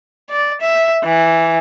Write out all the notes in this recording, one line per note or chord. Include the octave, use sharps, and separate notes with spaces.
D5
E5
E3